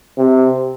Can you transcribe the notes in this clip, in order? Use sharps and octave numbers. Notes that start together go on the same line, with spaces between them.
C3